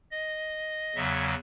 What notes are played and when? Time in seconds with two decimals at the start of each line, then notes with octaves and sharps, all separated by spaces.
0.11 D#5
0.96 E2 C#3 F#3 E5